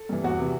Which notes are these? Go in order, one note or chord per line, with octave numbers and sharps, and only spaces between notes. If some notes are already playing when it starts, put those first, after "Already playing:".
Already playing: A4
G2 E3
E2 F#4
C3 E3